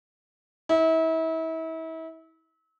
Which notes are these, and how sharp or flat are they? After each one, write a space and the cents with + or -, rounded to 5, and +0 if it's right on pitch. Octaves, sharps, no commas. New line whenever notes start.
E4 -35